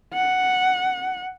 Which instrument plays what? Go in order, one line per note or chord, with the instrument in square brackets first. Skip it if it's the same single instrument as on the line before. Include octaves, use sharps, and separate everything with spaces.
[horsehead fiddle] F#5